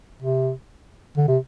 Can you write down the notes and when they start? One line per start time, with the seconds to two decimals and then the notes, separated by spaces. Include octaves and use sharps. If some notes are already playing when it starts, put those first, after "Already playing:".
0.23 C3
1.18 D3
1.28 C3